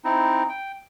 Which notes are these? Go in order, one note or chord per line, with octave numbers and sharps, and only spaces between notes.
C4 D#4 E4
G5